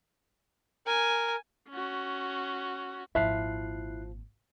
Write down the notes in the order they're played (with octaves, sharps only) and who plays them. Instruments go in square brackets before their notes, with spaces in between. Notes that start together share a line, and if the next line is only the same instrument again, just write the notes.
[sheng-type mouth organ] A#4 [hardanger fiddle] G#5
[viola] C#4 F#4
[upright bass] G#1 A#2 [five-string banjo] F3 E5 [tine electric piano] E4 F#6 C7